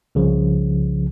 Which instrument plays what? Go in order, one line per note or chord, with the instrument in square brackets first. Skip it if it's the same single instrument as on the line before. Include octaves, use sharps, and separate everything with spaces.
[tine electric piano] C2 C#3 F3